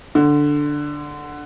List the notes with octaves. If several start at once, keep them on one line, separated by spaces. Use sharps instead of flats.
D3